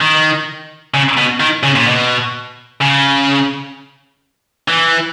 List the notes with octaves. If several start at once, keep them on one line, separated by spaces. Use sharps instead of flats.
D#3
C#3
B2
D#3
C#3
A#2
B2
C#3
E3